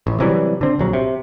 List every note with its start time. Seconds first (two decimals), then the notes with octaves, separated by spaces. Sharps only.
0.07 A1
0.20 C3 E3 F#3 G3
0.61 D3 C4
0.79 A#1 F#3
0.93 C3